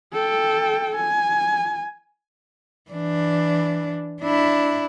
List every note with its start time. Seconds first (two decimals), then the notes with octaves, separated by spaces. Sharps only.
0.13 A4 G5
0.96 G#5
2.91 E3 D4
4.21 D4 E4